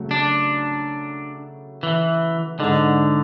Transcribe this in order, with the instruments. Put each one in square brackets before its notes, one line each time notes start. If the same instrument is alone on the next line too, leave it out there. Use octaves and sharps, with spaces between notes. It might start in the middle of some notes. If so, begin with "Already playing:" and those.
Already playing: [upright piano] C#3 F#3 A3
[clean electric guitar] D4
E3
[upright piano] G#2 G#3 D4 [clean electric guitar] D3